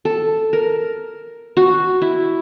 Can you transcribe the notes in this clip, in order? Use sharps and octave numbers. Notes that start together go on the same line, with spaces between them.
A4
A#4
F#4
E4